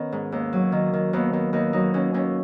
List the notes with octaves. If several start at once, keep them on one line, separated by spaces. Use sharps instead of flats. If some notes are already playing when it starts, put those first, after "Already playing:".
Already playing: D#3 B3 C#4
G#2
D#2
F#3
D#3
D#3
D#2 B3
D#2
D#2 D#4
F#3 D#4
D#2 C#4
D#2 C#4